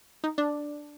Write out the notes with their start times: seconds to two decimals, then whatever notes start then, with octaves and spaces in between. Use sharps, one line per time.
0.24 D#4
0.38 D4